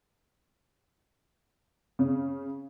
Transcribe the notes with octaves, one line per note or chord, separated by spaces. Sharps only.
C#3